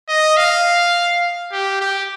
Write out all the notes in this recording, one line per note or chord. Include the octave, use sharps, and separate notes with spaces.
D#5
F5
G4
G4